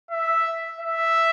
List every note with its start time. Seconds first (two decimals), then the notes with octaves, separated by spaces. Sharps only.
0.11 E5
0.79 E5